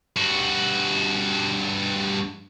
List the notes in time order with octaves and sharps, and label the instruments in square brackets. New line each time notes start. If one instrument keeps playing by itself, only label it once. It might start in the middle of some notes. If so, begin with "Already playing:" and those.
[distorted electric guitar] G2 F#4